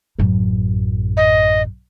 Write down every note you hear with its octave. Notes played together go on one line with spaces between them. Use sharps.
A1 F#2
D#5